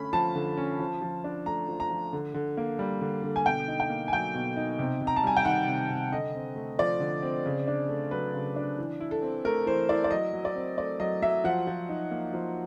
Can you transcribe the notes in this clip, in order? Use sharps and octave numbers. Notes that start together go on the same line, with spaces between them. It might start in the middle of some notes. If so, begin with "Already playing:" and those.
Already playing: D3 A3 C#4 B5
F3 A5
D3
C#4
F3
F3
D4
A3 A#5
F3
A#5
F3
D3
D3
A#3
G3
D3
D3
G#5
B2 G5
D#4
G5
A#3
G#5
F#3 G5
B2
D#4
C3
C3
A#5
A5
G3 G#5
G5
D#3 F#5
C3
C3
D3 D#5
C4
A3
F3 D5
D3
C4
C#3
D4
A3
F#3 B4
C#3
D4
E3
E4
A4
C4
A3 A#4
E3 C5
E4 D5
D5
F#3 D#5
F#3
D5
C4
A3 D5
F#3 D#5
F#3 E5
F3 F#5
F3
D#4
A#3
F3